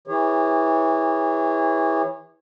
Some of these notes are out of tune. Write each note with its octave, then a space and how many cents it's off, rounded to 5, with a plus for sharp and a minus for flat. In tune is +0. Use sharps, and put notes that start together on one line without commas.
E3 -20 G#4 -45 C#5 -20